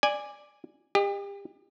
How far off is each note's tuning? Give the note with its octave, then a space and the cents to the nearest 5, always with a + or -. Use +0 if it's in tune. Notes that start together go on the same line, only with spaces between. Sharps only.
D5 +5 G#5 -10
G4 +35 D#5 -20